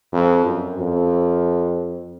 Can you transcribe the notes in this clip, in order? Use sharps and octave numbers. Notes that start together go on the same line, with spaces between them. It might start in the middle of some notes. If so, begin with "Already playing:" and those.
F2
F#2
F2